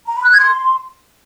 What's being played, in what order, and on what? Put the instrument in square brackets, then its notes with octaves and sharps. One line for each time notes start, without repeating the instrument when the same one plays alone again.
[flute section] A#5
B5
F#6
G#6
C6